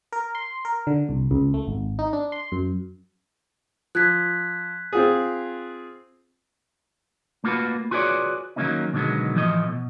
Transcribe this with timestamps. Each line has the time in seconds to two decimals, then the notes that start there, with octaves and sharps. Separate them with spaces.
0.12 A#4
0.35 C6
0.65 A#4
0.87 D3
1.09 C2
1.31 C#2
1.54 A3
1.67 G#1
1.99 D#4
2.13 D4
2.32 C6
2.52 F#2
3.95 F3 F#6 G#6 B6
4.93 C4 F4 G#4
7.44 A3 A#3 F4 F#4 B4
7.91 F4 F#4 G#4 B4 C#5 D5
8.56 D#3 F#3 A3 A#3 C#4 D#4
8.93 B2 D3 D#3 F#3 G#3 B3
9.35 A2 E3 F3 A3 D#5
9.66 B2